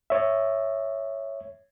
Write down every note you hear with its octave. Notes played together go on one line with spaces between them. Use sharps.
C#5 E5